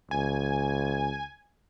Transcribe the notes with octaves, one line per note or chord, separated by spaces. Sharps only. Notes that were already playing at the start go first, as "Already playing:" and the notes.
C#2 G#5